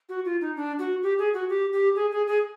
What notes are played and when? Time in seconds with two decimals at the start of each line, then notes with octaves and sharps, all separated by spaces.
0.09 F#4
0.25 F4
0.41 D#4
0.56 D4
0.79 F#4
1.03 G4
1.19 G#4
1.34 F#4
1.49 G4
1.73 G4
1.95 G#4
2.11 G#4
2.27 G#4